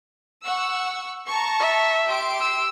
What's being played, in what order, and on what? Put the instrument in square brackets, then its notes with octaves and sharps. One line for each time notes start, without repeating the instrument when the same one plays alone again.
[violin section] F#5 C#6 E6
A5 A#5 C#6
[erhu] E5
[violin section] G4 C6 D7
[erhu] E6